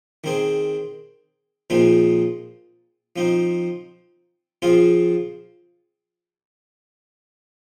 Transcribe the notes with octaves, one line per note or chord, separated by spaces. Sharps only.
D#3 C4 G#4
A#2 F3 C4 D#4 G#4
F3 C4 D#4
F3 C4 F4 G#4